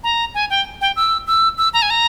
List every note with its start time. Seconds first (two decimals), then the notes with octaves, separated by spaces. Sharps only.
0.04 A#5
0.34 G#5
0.50 G5
0.81 G5
0.96 E6
1.27 E6
1.58 E6
1.74 A#5
1.82 G#5
1.90 A#5